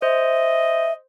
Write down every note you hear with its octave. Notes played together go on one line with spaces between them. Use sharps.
C5 D#5 E5